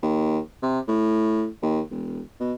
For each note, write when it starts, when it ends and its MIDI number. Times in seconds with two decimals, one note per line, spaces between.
0.03 0.39 39
0.63 0.80 48
0.88 1.47 45
1.62 1.80 39
1.91 2.21 28
2.40 2.53 47